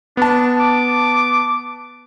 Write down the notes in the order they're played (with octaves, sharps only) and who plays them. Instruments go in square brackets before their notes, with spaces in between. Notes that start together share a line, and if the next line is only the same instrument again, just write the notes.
[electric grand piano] B3 A5 [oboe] D4
[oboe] D6